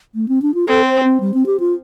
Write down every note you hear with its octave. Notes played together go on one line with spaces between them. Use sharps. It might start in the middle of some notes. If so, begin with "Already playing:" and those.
A3
C4
D4
F4
C4 A4
C5
C4
G3
C4
G4
F4